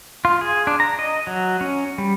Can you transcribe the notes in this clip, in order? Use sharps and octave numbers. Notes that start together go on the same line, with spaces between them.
F4
G#4
D4
A#5
D#5
F#3
C#4
G3